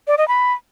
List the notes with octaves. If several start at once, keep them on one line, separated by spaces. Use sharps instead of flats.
D5
D#5
B5